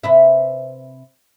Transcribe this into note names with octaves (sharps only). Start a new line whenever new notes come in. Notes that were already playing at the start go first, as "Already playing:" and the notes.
C3 B4 E5